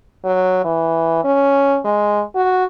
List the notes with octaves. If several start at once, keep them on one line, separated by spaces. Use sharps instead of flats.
F#3
E3
C#4
G#3
F#4